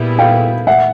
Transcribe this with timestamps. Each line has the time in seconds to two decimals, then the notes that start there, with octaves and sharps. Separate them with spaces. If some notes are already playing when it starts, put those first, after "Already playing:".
Already playing: A#2 G3 B3 E4 G#4
0.19 F5 G5
0.67 E5 F#5